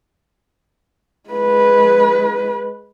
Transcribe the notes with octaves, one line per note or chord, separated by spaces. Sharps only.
G#3 B4